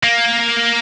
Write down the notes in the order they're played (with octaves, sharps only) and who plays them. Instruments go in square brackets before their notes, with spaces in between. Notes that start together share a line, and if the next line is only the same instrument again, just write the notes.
[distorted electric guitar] A#3